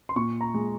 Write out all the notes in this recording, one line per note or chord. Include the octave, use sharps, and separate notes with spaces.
C6
A#2 C#6
A#5
G#3